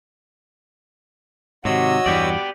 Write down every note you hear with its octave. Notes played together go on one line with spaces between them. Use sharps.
G#2 C3 D#3 F#4 C#5 D#5 E6
E2 G2 E3 B3 G4 D5